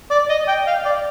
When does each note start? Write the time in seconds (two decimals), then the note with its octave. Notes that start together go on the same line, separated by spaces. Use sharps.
0.11 D5
0.30 D#5
0.48 G5
0.67 F5
0.85 D5